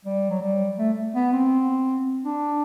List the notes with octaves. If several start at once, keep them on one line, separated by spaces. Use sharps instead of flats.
G3
F#3
G3
A3
B3
C4
D4